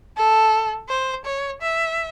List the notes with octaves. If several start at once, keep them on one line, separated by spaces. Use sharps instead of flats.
A4
C5
C#5
E5